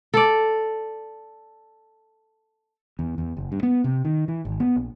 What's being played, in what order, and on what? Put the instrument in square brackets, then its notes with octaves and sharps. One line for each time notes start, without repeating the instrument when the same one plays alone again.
[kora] A4 D5
[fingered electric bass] E2
E2
F#1
G2
B3
C3
D#3
E3
G#1
B3
A#1